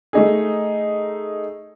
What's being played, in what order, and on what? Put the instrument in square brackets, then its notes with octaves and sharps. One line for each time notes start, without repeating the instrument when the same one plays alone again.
[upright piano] A3 D#4 G#4